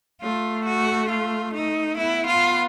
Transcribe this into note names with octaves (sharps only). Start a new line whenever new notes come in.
A3 F4
F#4
F4
D#4
B3 E4
F4